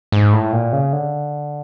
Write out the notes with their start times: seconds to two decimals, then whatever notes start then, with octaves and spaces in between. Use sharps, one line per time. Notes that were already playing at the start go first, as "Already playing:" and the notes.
0.12 G#2
0.33 A2
0.53 A#2
0.73 C#3
0.93 D3